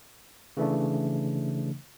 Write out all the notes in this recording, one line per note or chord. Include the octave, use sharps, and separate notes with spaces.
C#3 E3 A3 D4